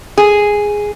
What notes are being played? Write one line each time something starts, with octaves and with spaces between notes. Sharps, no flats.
G#4